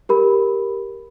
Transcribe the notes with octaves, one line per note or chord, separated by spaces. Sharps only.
G4 A#4 B5